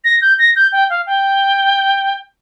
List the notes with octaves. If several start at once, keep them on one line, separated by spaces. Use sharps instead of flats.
A#6
G6
A#6
G6
G5
F5
G5